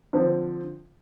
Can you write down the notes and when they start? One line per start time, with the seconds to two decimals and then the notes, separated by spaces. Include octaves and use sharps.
0.13 D3 F3 C4